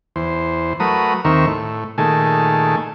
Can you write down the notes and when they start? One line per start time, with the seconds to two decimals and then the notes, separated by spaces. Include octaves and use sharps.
0.16 E2 C5
0.80 F#3 A3 A#4 B4 D#6
1.25 D#2 D#3 C4 A#4 E5 C#6
1.47 A2
1.98 A#2 D#3 A3 G#4 A4